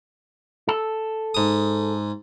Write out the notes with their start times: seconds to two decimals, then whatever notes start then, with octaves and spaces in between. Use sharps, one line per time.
0.69 A4
1.34 G#2 D#6